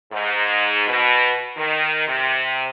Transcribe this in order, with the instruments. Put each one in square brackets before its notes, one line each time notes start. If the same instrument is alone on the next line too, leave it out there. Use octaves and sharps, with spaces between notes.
[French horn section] G#2
B2
D#3
C3